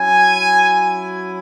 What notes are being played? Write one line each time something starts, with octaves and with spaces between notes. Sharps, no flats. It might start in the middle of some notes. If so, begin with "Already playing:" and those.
Already playing: F#3 C#4 E4 G#5